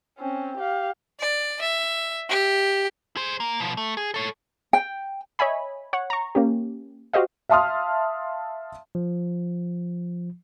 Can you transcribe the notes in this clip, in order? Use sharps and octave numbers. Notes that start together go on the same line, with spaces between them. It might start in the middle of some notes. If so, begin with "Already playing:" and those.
C4 C#4
G4 F5
D5
E5
G4
G#4 C5
A#3
B2 F3
A3
G#4
A4 C#5
G5
C#5 D#5 E5 G#5 B5
C#5 F#5
A#5 C#6
A#3 C#4 G4
F#4 G4 C5 D#5 F5
E5 F5 A5 C6 D#6 F6
F3